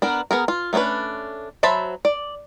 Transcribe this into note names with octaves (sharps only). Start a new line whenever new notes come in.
B3 D4 A#4
B3 G#4 A#4
F4
A3 B3 C#4 D4 B4
F#3 C5 E5 A5 B5
D5